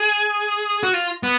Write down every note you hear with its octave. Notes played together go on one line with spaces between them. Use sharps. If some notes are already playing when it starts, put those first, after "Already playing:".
Already playing: G#4
F#4
F4
B3